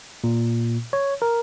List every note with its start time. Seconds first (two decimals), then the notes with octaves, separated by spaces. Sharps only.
0.24 A#2
0.93 C#5
1.22 A#4